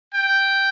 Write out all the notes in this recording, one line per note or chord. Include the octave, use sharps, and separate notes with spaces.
G5